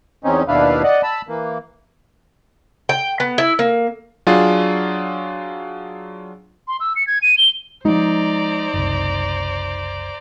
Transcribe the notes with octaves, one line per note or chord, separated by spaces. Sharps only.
E2 C4 C#4 D#4
D#2 B2 D4 E4 B4 F5
D5 D#5 F#5
A5 B5 E6
E3 A#3
G5
B3
E4
A#3
F#3 D4 F4 G#4
C6
E6
C#7
G#6
D#7
G7
F3 G#3 D#4 C5 D5 A#5
F#1 C2